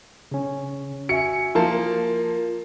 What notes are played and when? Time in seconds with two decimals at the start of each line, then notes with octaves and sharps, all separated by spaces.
0.31 C#3 C#4
1.09 F#4 E5 G#5 C#7
1.55 F3 A#3 F4 A5